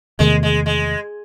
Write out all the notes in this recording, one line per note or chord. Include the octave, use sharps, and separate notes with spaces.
E2 C3 D#3 G#3 A3
G#3
G#3